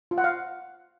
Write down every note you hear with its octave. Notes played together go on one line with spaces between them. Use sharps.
F4
F#5
F5